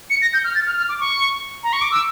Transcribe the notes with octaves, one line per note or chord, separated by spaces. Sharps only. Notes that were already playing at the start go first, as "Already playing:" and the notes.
C#7
A#6
G6
F6
A6
F6
F6
D6
C#6
A#5
C#6
D6
E6